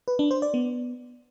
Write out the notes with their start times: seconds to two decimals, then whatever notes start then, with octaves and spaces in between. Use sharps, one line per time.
0.08 B4
0.19 D4
0.31 C5
0.42 D5
0.54 B3